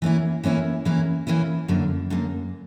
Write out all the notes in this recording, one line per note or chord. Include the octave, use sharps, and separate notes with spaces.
E3 A#3 C#4 E4
E3 A#3 C#4 E4
E3 A#3 C#4 E4
E3 A#3 C#4 E4
F#2 D3 A#3
F#2 D3 A#3